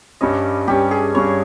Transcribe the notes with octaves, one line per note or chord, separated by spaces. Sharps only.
G2 G3 C#4 D#5
G2 G3 C#4 G4
G#4
G2 G3 C#4 C#5